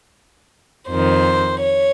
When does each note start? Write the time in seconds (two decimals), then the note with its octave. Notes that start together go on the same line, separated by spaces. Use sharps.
0.90 F2 D#3 C5
1.61 C#5